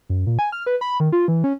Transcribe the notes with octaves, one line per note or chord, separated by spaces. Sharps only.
F#2
A#2
G#5
F6
B4
B5
D#3
F4
E3
C#4